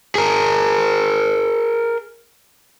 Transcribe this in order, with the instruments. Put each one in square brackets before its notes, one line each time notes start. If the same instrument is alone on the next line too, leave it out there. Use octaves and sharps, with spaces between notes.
[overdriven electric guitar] G#4 A#4